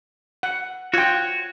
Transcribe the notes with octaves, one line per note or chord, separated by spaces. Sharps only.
F#5
F4 F#4 C#5 G5